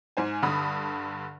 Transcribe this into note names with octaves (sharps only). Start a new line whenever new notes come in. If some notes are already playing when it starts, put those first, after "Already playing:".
G#2 C5 G#5
G2 D3 B5 D#6